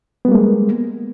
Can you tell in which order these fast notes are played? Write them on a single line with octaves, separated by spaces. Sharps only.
B3 G3 A#3 G#3